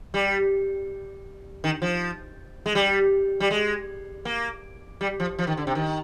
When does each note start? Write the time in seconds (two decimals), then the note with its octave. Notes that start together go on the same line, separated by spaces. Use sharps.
0.14 G3
1.64 D#3
1.82 F3
2.66 G#3
2.75 G3
3.40 G3
3.51 G#3
4.25 A#3
5.01 G3
5.20 F3
5.39 F3
5.47 D#3
5.57 D3
5.67 C3
5.75 D#3